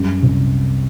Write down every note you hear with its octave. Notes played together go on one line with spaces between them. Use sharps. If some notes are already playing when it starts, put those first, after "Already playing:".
Already playing: F#2 G3
C2